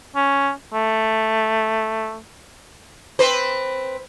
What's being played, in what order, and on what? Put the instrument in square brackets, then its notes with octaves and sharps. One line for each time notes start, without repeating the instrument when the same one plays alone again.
[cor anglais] C#4
A3
[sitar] C4 B4 C5